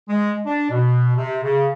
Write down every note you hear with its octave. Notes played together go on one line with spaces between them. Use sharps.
G#3
D4
B2
C3
C#3